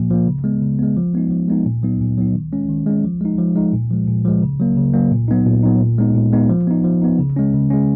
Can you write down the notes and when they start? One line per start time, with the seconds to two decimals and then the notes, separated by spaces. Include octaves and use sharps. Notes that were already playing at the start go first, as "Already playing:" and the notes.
Already playing: A#2 F3 A#3
0.10 F3 A#3
0.27 C#3
0.44 G#3 B3
0.62 C#3
0.79 G#3 B3
0.97 F3
1.14 G#3 B3 D#4
1.31 F3
1.48 G#3 B3 D#4
1.66 A#2
1.83 F#3 B3 D#4
2.01 A#2
2.18 F#3 B3 D#4
2.35 D#3
2.52 G#3 C#4
2.69 D#3
2.86 G#3 C#4
3.05 F3
3.21 G#3 D#4
3.38 F3
3.56 G#3 D#4
3.73 A#2
3.91 F3 G#3
4.08 A#2
4.25 F3 G#3
4.42 C#3
4.60 F#3 A#3
4.77 C#3
4.94 F#3 A#3
5.12 A#2
5.28 F#3 B3 D#4
5.46 A#2
5.63 F#3 B3 D#4
5.81 A#2
5.98 G#3 B3 D#4
6.15 A#2
6.32 G#3 B3 D#4
6.50 F3
6.67 B3 D#4
6.84 F3
7.02 B3 D#4
7.18 C#3
7.36 G#3 C#4
7.54 C#3
7.70 G#3 C#4